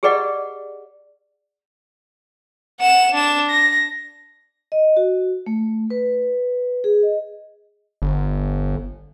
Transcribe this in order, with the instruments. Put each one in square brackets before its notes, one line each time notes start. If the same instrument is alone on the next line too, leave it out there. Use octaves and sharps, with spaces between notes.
[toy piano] G4 G#4 B4 D5 D#5 F#5
[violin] F#5 E7
D4 E7
A#6
[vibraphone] D#5
F#4
A3
B4
G#4
D#5
[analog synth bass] G1